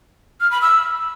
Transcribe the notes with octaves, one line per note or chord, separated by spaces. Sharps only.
F6
B5
E6